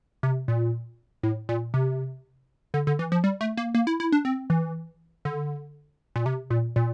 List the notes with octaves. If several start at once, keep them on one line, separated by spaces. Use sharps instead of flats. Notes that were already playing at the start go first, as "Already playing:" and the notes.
C3
A#2
A2
A#2
C3
D3
D3
E3
F3
G3
A3
A#3
A#3
E4
E4
D4
C4
E3
D3
A#2
C3
A#2
A#2